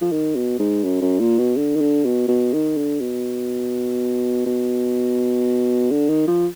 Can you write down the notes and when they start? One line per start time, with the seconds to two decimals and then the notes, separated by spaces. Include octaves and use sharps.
0.01 F3
0.12 D#3
0.35 B2
0.59 G#2
0.84 F#2
1.01 F#2
1.20 A#2
1.39 B2
1.56 D3
1.76 D#3
1.81 D3
2.05 B2
2.28 B2
2.53 D#3
2.77 D3
3.00 B2
4.46 B2
5.91 D3
6.09 D#3
6.28 F3